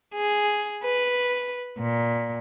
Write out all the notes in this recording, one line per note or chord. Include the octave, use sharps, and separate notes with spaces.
G#4
B4
A#2